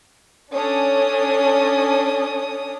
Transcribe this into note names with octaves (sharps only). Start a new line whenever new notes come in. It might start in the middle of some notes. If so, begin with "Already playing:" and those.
C#4 D4 A4 D#6